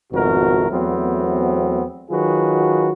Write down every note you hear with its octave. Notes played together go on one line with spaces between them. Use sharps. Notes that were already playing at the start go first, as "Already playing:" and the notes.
G#1 F2 B2 A3 F#4 A#4
E2 F#3 A3 B3 C4
D#3 F#3 F4 F#4 G#4 B4